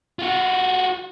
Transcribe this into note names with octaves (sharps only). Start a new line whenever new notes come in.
F4 F#4